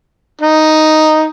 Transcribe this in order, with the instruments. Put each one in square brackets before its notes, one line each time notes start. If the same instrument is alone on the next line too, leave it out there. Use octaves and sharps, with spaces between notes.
[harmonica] D#4